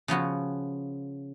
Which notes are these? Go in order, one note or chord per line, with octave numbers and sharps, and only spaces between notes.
C#3 F3 B3 F#4